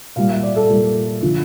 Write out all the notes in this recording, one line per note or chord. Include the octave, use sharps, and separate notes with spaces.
A#2 G3 F5
E5
D5
A4
A#2 G3
D3 F3